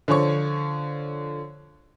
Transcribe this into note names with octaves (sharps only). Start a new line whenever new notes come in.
D3 F3 C#5 C#6